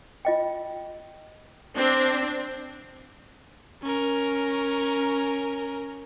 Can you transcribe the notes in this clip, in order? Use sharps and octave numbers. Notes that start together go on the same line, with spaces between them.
F4 D#5 G5
C4 D4
C#4 A#4